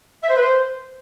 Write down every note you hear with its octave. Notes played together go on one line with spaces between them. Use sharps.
E5
C5
B4
C5